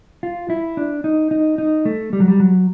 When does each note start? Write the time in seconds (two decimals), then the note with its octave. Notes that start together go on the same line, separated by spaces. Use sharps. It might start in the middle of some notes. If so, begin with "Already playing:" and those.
0.23 F4
0.50 E4
0.77 D4
1.04 D#4
1.31 D#4
1.58 D#4
1.85 A3
2.13 G3
2.20 F#3
2.28 G3
2.40 F#3